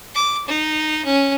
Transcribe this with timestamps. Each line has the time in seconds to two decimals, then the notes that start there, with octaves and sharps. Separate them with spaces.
0.15 D6
0.48 D#4
1.05 C#4